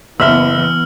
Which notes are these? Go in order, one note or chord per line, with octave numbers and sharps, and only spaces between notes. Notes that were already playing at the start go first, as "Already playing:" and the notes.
F#1 E3 B3 E5 E6 F6